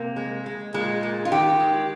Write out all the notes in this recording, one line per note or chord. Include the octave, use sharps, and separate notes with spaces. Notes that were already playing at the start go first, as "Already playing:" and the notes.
Already playing: C3 A#3
G#3
G#3
A#2 G#3
A#2
F4
D#3 G4
G#3